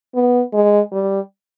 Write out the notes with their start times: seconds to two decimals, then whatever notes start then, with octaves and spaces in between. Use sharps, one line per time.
0.14 B3
0.53 G#3
0.92 G3